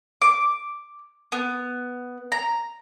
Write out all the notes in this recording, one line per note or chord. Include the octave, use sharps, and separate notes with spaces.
D6
B3
A#5